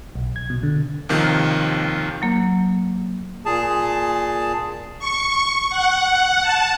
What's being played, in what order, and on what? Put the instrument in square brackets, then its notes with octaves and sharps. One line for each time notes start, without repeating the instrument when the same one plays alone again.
[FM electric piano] B1
G#6
B2
D3
[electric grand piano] D#2 C3 D#3 F3
[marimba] F#3 A#3
[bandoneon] A#2 G#4 A5
[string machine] C#6
F#5
A5